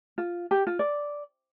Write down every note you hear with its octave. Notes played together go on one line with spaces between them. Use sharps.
F4
G4
F4
D5